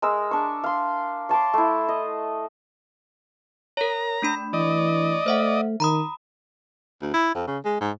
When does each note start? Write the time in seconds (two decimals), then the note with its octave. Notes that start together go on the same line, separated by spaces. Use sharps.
0.02 G#3 A#4 E6
0.31 D4 C#6
0.64 F5 C6
1.29 C#5 A5 C6 D6
1.54 A3 E4
1.89 D#5
3.77 A#4 C#5 A#5
4.22 A3 D4 B5
4.53 E3 D5 D#5
5.26 A3 C5 E5 F#5
5.80 D#3 A#5 B5 D#6
7.02 D2
7.14 E4
7.35 F2
7.47 C#3
7.65 G#3
7.81 G#2